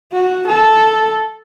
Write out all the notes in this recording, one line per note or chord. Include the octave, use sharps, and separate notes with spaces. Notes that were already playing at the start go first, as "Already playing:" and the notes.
F#4
A4